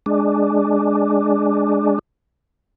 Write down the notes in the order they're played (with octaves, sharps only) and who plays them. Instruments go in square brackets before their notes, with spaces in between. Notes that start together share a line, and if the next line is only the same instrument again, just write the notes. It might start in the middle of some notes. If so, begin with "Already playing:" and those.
[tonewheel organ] G#3 D4